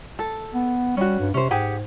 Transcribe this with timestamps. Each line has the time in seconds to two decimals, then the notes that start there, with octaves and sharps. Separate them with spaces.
0.19 A4
0.54 B3
0.97 G3 C#4 F#4
1.20 G2
1.34 C3 C#4 C5
1.51 G#2 G4 G#4 F#5